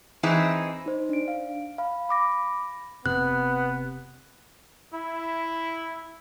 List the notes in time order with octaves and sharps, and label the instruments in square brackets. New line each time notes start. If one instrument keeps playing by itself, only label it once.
[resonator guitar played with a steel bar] E3 C4 D#4 E4 G#4
[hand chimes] D#4 C5
D4 D7
F5
F5 B5
B5 D6 A#6
[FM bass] F1 [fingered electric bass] C3 [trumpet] B3 [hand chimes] F#6
[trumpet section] E4